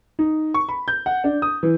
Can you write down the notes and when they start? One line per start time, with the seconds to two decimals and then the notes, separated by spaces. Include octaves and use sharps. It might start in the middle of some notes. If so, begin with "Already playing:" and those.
0.19 D#4
0.54 C#6
0.69 B5
0.88 G6
1.06 F#5
1.24 D4
1.42 D#6
1.63 E3